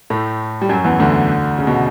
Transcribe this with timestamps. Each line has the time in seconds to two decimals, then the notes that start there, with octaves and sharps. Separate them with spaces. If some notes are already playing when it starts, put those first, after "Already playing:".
0.10 A2 A3
0.61 G3
0.69 F#2 F#3
0.84 E2 E3
0.99 D2 D3
1.58 C#3
1.67 B2